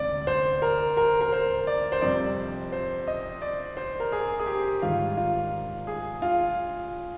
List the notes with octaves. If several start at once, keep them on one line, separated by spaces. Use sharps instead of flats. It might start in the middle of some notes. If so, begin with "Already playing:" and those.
Already playing: D2 C3 G#3 D5
C5
A#4
A#4
A#4
C5
D5
C5
F2 C3 G3 D5
C5
D#5
D5
C5
A#4
G#4
G#4
G4
G#2 D#3 G3 F4
F4
G#4
F4